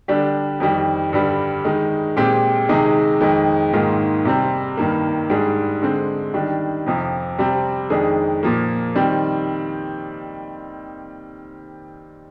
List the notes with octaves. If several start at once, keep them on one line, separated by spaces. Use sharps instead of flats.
D3 G3 D4 G4
F2 D#3 G3
G2 D3 G3
D#3 G#3 D#4
A#2 G#3 C4 G4
C3 D#3 G#3 D#4 G#4
F2 D#3 G#3
G#2 D#3 A#3 F4 G#4
C3 G3 C4
G2 D#3 A#3
G#2 G3 D4 G#4
D3 G#3 C4
D#3 G3 D4
F2 C3 F3
C3 G3 C4
F2 D#3 G#3 D4 G#4
A#2 F3 A#3
D#3 G3 C4